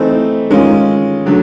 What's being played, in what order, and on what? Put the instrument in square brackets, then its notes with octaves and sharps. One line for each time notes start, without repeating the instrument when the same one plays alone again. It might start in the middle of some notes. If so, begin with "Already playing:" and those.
Already playing: [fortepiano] E3 A3 C4 D#4
D#3 G#3 C#4 F4
D3 F#3 A3